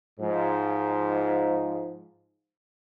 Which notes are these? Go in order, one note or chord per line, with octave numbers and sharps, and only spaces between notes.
G#2 F3